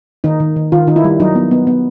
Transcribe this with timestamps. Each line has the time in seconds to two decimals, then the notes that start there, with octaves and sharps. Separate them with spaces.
0.24 D#3 D#4
0.40 D#3
0.56 D#3
0.72 D#3 F4
0.87 D#3 D#4
0.96 E4
1.04 G3
1.20 F#3 D#4
1.35 B3
1.51 B3
1.67 B3